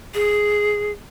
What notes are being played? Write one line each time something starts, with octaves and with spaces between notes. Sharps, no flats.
G#4